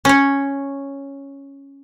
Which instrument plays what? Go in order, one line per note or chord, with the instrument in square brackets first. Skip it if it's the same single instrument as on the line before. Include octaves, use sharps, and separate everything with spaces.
[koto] C#4 C#5